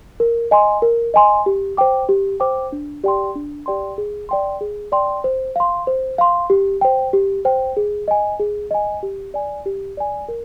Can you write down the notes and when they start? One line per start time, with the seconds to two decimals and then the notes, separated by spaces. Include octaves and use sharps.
0.20 A#4
0.51 D#5 G#5 C6
0.82 A#4
1.14 D#5 G#5 C6
1.46 G4
1.77 C5 G5 D6
2.09 G4
2.40 C5 G5 D6
2.72 D4
3.04 G4 D5 G5 C6
3.35 D4
3.66 G4 D5 G5 C6
3.98 G#4
4.29 D5 G5 C6
4.61 G#4
4.92 D5 G5 C6
5.24 C5
5.56 F5 C6
5.87 C5
6.18 F5 C6
6.50 G4
6.81 C5 G5
7.13 G4
7.45 C5 G5
7.77 G#4
8.08 D#5 G#5
8.40 G#4
8.71 D#5 G#5
9.03 G4
9.34 D5 G#5
9.66 G4
9.97 D5 G#5
10.28 A#4